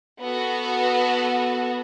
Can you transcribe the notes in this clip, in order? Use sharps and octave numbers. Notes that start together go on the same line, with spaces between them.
B3 F#4 A4